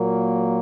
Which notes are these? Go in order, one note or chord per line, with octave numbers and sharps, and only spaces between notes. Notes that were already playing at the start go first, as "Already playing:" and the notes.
Already playing: A#2 F#3 A#3